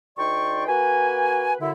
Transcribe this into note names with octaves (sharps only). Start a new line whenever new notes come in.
D2 D#4 D5 G5 C6 C#6
A#3 F#4 B4 G#5
F#2 D3 E4